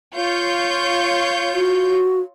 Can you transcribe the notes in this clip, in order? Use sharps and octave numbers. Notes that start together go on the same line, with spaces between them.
F4 C#5 G6
F#4